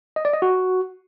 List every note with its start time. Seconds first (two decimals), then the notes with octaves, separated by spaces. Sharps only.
0.16 D#5
0.25 D5
0.33 D#5
0.42 F#4